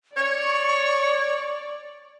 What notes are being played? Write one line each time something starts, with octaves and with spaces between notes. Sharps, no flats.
C#5 D5 C#6